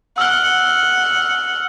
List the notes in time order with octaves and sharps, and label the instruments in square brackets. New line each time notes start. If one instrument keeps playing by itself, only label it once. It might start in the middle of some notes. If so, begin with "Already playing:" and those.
[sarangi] F#5 [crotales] E6 F6